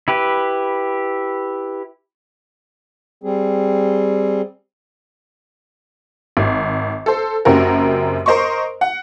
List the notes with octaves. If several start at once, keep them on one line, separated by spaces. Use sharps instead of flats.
E4 G4 B4
G3 C4 G#4
G#1
A4 C5
F#1 F#2 C4 F#4 G4 A#4
A#4 C5 D#5 C6 C#6
F#5